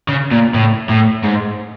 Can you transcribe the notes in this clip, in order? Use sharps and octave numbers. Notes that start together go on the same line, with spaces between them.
C#3
A#2
A2
A2
G#2